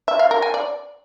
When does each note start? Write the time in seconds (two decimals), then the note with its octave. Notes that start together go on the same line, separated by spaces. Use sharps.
0.08 E5
0.19 F5
0.31 A#4
0.42 G#5
0.54 D5